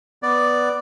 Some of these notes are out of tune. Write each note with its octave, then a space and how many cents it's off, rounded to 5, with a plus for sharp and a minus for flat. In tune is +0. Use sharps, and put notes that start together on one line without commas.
B3 +0 D5 +0